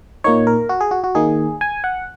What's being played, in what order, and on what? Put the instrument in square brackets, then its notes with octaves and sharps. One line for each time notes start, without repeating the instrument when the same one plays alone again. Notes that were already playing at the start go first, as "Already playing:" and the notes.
[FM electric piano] A#2 A#3 D#4 C#5
A#4
F#4
G#4
F#4
F#4
D#3 A#3 D#4 G#4
G#5
F#5